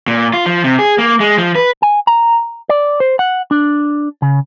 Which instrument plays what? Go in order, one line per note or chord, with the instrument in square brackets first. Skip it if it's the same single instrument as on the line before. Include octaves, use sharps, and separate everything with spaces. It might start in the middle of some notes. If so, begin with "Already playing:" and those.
[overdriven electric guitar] A#2
F4
F3
C3
G#4
A#3
G#3
F3
B4
[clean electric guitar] G#5
A#5
D5
C5
F#5
D4
C#3